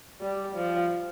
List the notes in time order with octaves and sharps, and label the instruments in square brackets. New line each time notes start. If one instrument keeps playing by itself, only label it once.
[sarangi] G3
F3